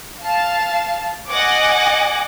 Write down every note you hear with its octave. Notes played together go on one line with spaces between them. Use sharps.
F5 A5
D#5 F#5 G#5 D6